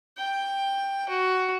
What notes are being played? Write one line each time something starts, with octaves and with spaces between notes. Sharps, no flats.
G5
F#4